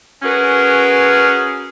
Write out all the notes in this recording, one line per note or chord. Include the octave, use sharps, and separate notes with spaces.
C#4 F#4 G#4 A#4 B4